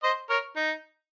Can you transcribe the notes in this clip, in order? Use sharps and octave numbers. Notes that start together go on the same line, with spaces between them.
C5 D#5
A#4 C#5
D#4